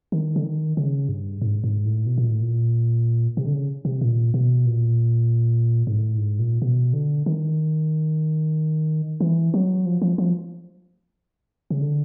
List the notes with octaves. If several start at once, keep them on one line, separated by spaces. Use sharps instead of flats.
D#3
D3
D#3
C#3
G2
G#2
G#2
A2
B2
A#2
A2
A#2
C3
D3
C#3
C3
A#2
B2
A#2
G#2
A2
G#2
A#2
B2
D3
D#3
E3
F#3
F3
F3
F3
C#3
D3